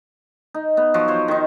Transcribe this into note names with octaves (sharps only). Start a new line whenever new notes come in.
D#4
B3
F3 F#3 F#4
F3 C5 C#5
D#3 D#4